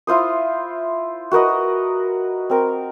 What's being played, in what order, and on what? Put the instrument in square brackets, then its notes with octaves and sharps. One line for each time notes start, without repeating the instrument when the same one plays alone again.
[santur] E4 F4 C5 D#6
F#4 A#4 B4 D#5
C4 A#4